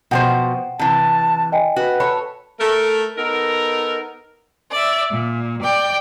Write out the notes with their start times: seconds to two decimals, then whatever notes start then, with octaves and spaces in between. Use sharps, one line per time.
0.11 B2 F3 C5 F#5 G5
0.79 C3 E3 A5
1.52 D#5 G5 G#5
1.76 F#4 B4
2.00 A4 C#5 B5
2.60 A3 A#4
3.17 B3 D#4 A4 A#4
4.70 D5 E5
5.11 A#2
5.63 D5 G5